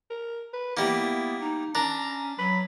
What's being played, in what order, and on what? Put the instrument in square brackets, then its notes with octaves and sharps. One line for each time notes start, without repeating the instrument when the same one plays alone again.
[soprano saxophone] A#4
B4
[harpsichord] G3 A#3 [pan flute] B3 [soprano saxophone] E4
[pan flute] D#4
[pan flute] C#4 [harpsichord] D4 [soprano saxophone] A#5
[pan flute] F#3 [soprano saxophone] B5